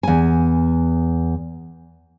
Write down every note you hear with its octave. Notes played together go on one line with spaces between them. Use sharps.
E2 G#5